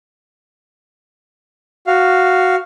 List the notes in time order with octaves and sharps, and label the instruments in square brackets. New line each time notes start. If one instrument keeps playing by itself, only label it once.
[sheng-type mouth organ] F#4 F5